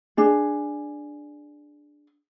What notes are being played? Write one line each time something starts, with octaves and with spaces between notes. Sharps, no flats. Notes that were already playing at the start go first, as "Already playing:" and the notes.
D4 G#4